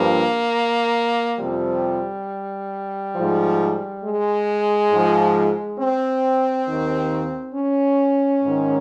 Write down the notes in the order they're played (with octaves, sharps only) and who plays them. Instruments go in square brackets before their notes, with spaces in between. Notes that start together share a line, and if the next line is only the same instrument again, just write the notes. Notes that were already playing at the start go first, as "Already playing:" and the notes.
Already playing: [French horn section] G2 F3 A#3
F2 C3 F3 G3
G#2 F3
G#3
G#2 F3
C4
D#2 D#3
C#4
G#2 D#3